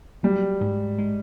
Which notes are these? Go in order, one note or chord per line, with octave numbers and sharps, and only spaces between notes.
F#3 G3
G#2
G#3